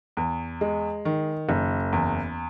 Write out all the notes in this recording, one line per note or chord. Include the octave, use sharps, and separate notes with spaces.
E2
G#3
D#3
F#1
E2